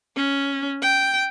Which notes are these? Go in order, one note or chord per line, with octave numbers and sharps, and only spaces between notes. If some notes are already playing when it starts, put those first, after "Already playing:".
C#4
G5